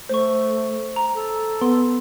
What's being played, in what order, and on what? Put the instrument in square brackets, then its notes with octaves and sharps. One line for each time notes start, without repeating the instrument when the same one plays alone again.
[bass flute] A3 [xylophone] C5 C#6
[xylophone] A#5
[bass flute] A4
[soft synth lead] B3 [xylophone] C6